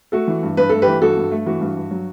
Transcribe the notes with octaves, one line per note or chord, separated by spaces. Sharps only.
A3 F#4 A4
E3
G2
G2 B4
A3 A4
G4 B4
E3
G2 F#4 A4
G2
A3
E3 F#4
G2
G2
F#3